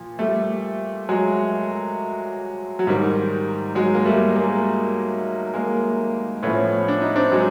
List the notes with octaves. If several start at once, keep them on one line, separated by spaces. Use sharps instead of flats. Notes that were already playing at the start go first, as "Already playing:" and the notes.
Already playing: A#2 F3
G3 A3
F#3 G#3
F#3
G#2 D#3 G3
F#3 G#3
A#3
G3 A3
G#3 A#3
G#3 A#3
A2 F3 B3 C#4
D4
D#4
C4 D4
F#3 G#3